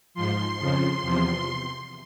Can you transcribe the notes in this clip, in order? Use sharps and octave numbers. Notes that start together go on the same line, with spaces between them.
G#2 F3 C6
F2 C#3 F3
E2 C3 F3